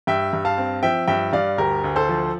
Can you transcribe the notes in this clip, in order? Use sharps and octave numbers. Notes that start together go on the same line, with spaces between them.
G2 E5 G5
G2
F5 A5
C4
F3 E5 G5
G2 E5 G5
G2 D5 F5
D2 G4 A#4
D2
A4 C5
F3